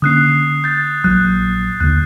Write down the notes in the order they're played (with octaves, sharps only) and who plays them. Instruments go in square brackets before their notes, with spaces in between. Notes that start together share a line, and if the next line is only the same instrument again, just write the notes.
[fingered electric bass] D3 A#3 C#4 [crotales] D#6 F#6 C7
[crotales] G6 A6
[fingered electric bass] A#1 F#3 [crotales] F#6
[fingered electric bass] D#2 D3 [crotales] F#6